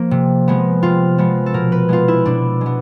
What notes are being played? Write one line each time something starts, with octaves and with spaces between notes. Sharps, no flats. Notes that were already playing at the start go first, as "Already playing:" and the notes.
Already playing: F3 A#3
C3
F3 G#3 B3
C3 F4
F3 G#3 B3
A4
B2 A#4
B4
G#3 B3 F4
E4
B2 D4
G#3 B3